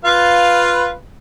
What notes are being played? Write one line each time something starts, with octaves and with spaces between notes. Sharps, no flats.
F4 B4 F5